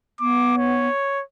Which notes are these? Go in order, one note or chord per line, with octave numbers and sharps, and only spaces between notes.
B3 D6
C#5